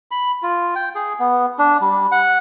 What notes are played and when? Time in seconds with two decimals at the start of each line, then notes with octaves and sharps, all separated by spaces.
0.11 B5
0.43 F4
0.76 G5
0.95 G#4
1.20 B3
1.59 D4
1.81 G3
2.12 F#5